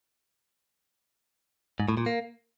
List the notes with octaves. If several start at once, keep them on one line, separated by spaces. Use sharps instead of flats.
G#2
A2
A#2
A#3